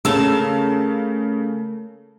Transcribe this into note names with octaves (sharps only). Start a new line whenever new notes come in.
C#3 A3 A#4 A5 E6